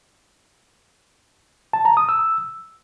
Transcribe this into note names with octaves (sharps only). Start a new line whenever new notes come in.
A5
A#5
D#6
E6